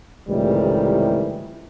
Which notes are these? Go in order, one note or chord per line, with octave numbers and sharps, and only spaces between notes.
C#2 A2 C3 D#3 E3 G3